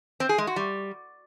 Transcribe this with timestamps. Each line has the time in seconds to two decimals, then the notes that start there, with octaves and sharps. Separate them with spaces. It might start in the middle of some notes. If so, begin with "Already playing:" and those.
0.20 C4
0.29 G#4
0.38 G#3
0.47 F#4
0.56 G3